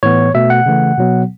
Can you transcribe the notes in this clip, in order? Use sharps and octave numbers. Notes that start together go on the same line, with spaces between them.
A2 E3 B3 C#5
B2 A3 E5
F#5
C#3 E3 A3
B2 F#3 B3